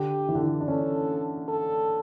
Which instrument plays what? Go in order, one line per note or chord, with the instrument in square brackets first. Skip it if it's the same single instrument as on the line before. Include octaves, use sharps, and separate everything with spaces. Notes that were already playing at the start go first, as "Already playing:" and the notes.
Already playing: [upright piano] D3 [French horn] G4
[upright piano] E3
D3
E3
D4
[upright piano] C#4 [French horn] A4
[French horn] A4